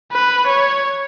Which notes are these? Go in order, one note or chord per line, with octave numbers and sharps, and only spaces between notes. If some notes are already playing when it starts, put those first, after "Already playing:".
B4
C#5